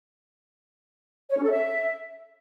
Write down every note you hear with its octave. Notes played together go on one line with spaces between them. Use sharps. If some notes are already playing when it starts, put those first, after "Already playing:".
C#5
C#4
A4
E5